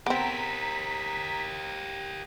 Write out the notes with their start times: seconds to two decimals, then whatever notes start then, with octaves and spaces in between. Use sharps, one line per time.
0.06 B3 C4 G4 A#4 A#5 B6